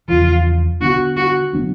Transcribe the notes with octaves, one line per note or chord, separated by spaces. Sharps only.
E2 C#3 F3 F4
D3 F#3 B3 D4 F#4
F#4
D3 F#3 B3 D4